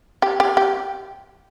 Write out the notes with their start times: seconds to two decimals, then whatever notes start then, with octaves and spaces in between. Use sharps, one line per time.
0.22 G4
0.40 G4
0.57 G4